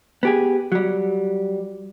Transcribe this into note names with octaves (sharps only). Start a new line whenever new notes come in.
B3 G4 G#4
F#3 G3